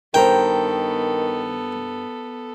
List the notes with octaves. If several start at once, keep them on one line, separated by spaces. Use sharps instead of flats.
G2 D#3 B3 A4 A#4 C5 G5